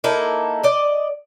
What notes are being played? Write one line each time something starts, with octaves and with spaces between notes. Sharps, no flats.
A#3 D#4 E4 A4
D5 D#5